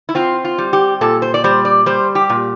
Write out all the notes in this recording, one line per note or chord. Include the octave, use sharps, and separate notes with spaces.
E4
C4 F4
F4
G3
G4
A#2 A4
C5
D5
G3 C5
D5
G3 C5
G4
A#2